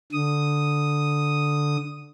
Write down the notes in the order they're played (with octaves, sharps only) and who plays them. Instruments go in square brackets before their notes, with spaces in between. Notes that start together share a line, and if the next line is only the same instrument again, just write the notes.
[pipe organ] D3 D#6